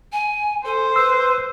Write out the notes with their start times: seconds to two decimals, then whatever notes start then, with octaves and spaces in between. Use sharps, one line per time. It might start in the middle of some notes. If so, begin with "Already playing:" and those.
0.12 G#5
0.65 A4 C5
0.96 B4 E6